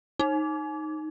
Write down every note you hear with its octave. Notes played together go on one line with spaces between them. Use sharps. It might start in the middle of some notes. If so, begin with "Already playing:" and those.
D#4